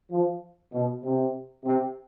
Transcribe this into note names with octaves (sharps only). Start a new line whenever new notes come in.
F3
B2
C3
C3